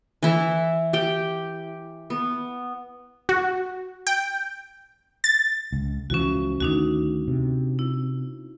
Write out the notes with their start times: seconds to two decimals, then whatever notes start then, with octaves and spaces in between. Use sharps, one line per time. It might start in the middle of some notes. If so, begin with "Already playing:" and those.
0.23 E3 E4 E5
0.93 G4 G5
2.10 B3
3.29 F#4
4.07 G5
5.24 A6
5.73 C#2
6.10 C#2 E3 F3 C#4 F#4
6.61 D2 D#3 D4 D#4 F#4
7.27 C3
7.79 E4